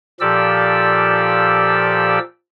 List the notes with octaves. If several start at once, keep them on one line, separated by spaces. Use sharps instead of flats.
A#2 F3 G4 A4 D5 E6